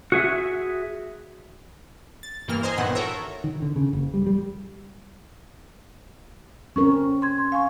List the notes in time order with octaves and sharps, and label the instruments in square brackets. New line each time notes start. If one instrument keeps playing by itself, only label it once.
[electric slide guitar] F#4 G#4 E5
[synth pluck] A6
G2 E3 A#3 F6
C5 D#5 G#5 A#5 C6
A#1 G2 D#3 E3 B3 F#5
F#4 A4 A#4 C#5 E5 A#5
[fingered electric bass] D#3
D3
C#3
F#1
G3
G3
[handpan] C4 C#4 A#4 [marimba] C#6
[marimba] C6 G#6
F5 G#5 C#6